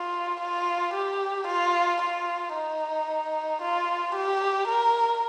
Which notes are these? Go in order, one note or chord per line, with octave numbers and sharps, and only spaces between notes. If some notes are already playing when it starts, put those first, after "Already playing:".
Already playing: F4
F4
G4
F4
F4
D#4
F4
G4
A#4